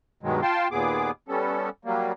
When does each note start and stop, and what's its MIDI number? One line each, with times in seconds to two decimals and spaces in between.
0.23 0.41 43
0.23 0.41 47
0.23 0.41 51
0.23 0.41 54
0.23 0.41 56
0.42 0.68 65
0.42 0.68 79
0.42 0.68 81
0.42 0.68 84
0.71 1.11 39
0.71 1.11 46
0.71 1.11 59
0.71 1.11 68
0.71 1.11 86
1.28 1.69 55
1.28 1.69 59
1.28 1.69 61
1.28 1.69 69
1.85 2.12 54
1.85 2.12 55
1.85 2.12 58